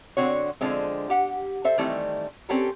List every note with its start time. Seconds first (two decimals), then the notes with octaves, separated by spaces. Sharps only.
0.17 D3 C4 F#4 C#5
0.61 D3 F3 G#3 C4
1.10 G4 F#5
1.64 A4 C5 E5
1.78 D#3 E3 G3 A3 C4 E4
2.49 C4 C#4 G4 A4 A#4